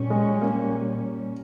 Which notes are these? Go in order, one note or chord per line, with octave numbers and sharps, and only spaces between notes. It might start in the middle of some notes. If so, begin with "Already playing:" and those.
Already playing: A#2 G3 C#4
G#3
A#3